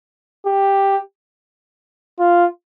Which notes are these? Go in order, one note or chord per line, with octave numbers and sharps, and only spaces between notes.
G4
F4